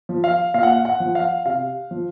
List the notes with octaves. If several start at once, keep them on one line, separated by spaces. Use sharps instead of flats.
F3
F5
A#2 F5
F#5
F5
F#5
F3
F5
C3 F5
F3